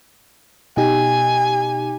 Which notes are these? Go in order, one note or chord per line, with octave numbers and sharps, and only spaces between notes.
B2 D#4 G4 G#5